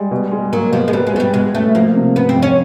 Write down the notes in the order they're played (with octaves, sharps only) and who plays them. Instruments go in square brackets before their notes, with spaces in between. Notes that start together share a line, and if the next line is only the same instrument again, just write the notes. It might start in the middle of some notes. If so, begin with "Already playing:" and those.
Already playing: [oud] G3 [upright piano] G#3
[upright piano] B2
G#3
[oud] F#3 [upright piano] A#3
[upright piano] B2 [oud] F3
[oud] G#3
[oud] G3 [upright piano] B3
[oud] G#3
[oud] F#3 [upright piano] B3
[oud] G3
[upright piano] B2 [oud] G#3
[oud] A3 [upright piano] C#4
[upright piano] F3 [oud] A#3
[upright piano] C3
[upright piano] C#3 [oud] B3
[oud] C4
[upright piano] F2
[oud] C#4